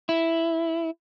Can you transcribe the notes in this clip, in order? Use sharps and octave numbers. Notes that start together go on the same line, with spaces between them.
E4